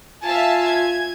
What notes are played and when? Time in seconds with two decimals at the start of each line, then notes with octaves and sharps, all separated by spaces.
0.23 F4 E5 F5 G#5 A5
0.66 G#6